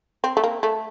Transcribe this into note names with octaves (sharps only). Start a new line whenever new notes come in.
C4
A3
A#3
A3